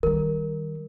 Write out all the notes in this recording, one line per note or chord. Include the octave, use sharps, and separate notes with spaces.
D#3 G3 A#4